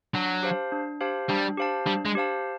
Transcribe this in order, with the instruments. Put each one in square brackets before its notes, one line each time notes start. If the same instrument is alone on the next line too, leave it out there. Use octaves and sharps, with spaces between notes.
[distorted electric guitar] F#3 [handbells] D4
[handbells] G4 C5 F5 A5
D4
G4 C5 F5 A5
[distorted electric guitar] G3 [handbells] D4
[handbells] G4 C5 F5 A5
[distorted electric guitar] G3 [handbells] D4
[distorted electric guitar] G#3
[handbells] G4 C5 F5 A5